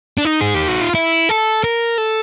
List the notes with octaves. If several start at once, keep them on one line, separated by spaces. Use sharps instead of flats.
D4
D#4
G#4
G4
F#4
F4
E4
A4
A#4
A4